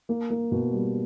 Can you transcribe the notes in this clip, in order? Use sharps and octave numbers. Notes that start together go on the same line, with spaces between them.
A#3
A#3
B2
G3